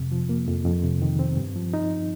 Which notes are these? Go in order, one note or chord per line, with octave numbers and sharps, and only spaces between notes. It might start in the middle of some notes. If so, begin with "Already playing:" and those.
Already playing: F2 C3
F3
A#3
F2
F2
C3
D#3
C4
G2
F3
D#4